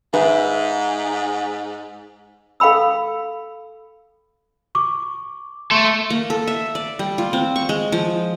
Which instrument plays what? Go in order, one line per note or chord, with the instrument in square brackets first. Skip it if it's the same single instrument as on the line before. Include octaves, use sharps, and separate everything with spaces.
[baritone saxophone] G#2 [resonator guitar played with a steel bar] B4 E5
[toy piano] A4 F5 G5 B5 E6
[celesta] C#6 D6
[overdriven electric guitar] A3 A4 [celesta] C6 C#6
[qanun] A#3
A4
E5
D5
G3
F4
C4
C#6
G#3
F3